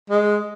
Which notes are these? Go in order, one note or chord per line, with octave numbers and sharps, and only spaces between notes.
G#3